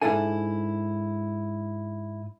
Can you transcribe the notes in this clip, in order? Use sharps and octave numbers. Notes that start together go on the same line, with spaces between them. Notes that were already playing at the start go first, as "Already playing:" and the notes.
G#2 C#4 D4 E4 A4 G#5